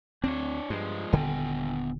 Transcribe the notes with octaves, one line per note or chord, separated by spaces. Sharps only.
D2 C4 D4 C#5
G2 F3 G#3
D#1 D3 B3 G5 G#5